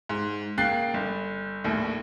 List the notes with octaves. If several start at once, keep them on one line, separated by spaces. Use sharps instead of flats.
G#2
C#3 A#3 G5 F#6 A6 C7
G1
A#1 D#2 A2